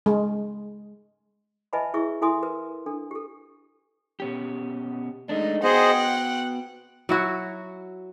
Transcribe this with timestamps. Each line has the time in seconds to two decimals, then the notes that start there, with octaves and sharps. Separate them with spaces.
0.06 G#3
1.73 B4 D#5 E5 G#5 A5 B5
1.94 E4 G#4 B4 E5 C#6 E6
2.21 E4 A4 E5 G#5 C6 D#6
2.43 A#4 B4
2.86 D4 A4
3.11 G4 A4
4.20 B2 C#4 G4
5.29 G#3 A3 D4 D#4
5.63 B3 F#4 G#4 C5 D#5 F#5 G5
6.04 F#6
7.09 F#3 E4 F#4